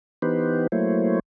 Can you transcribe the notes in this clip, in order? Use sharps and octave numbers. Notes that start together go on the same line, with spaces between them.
E3 B3 D#4 G4 B4 C5
F#3 A3 A#3 E4 C5 C#5